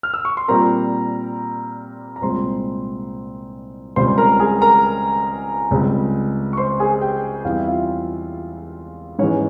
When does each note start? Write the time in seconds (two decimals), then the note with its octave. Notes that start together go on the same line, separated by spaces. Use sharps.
0.03 F6
0.14 E6
0.25 C#6
0.37 C6
0.48 A#2 G3 C4 A#4 A#5
2.16 A#5
2.22 C2 A#2 G#3 C4 C5 C6
3.96 C#2 C#3 G3 C4 C5 C6
4.18 A#4 A#5
4.40 G#4 G#5
4.62 A#4 A#5
5.71 C#2 C#3 G3 C4
6.53 C#6
6.57 C5 C6
6.79 G#4 G#5
7.01 G4 G5
7.45 E2 E3 G3 C4 F5
7.57 E5
7.68 F4 F5
9.19 G#2 E3 G#3 C#4 C#5